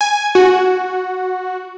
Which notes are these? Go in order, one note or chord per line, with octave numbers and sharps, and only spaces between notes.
G#5
F#4